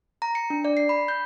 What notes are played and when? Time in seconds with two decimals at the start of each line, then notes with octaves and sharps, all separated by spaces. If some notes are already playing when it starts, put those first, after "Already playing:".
0.22 A#5
0.35 C#7
0.50 D4
0.65 D5
0.77 C7
0.89 B5
1.08 G6